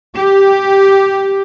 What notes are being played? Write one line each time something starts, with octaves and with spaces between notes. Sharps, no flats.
G4